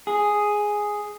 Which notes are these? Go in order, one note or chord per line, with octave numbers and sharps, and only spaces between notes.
G#4